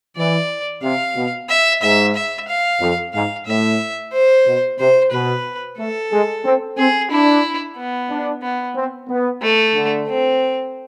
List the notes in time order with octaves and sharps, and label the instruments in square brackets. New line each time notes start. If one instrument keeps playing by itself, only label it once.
[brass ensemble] E3 [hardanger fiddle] D5
[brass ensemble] C3 [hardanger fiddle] F5
[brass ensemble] B2
[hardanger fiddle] E5
[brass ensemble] G#2 [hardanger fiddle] E5
[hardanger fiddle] E5
F5
[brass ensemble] F2
[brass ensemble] G#2 [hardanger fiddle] F5
[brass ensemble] A2 [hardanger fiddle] E5
[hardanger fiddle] C5
[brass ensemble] B2
[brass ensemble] C3 [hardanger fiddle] C5
[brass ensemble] B2 [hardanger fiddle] B4
[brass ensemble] A3 [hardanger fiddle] A4
[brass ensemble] G#3
C4
[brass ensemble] C4 [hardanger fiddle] G#4
[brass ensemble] D4 [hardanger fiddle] E4
[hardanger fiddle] B3
[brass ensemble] D4
[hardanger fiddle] B3
[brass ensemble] C4
B3
[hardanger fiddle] A3
[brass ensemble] D3
[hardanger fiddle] C4